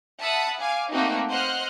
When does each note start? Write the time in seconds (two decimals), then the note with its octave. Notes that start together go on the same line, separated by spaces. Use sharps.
0.21 E5 F#5 A5 B5 D#6
0.60 F5 G#5 D6
0.90 A3 A#3 C4 D#4 F#4
1.28 C5 D#5 F#5 C6 F6 F#6